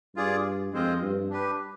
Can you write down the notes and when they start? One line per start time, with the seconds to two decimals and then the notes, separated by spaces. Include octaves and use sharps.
0.16 G2 F4 G#4 D5
0.73 F2 G#3 C4 F4 C5 D#5
1.02 G2
1.30 D4 G4 B4